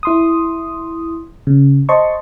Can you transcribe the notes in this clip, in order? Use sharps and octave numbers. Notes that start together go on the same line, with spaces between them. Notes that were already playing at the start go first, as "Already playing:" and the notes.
E4 C6 D#6
C#3
C5 D#5 A5 C6 C#6